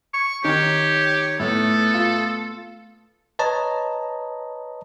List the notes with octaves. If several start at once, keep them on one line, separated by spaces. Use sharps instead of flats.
C#6
D#3 G4 C#5
A2 A3 B3 A4
F4
B4 C#5 D#5 A5 A#5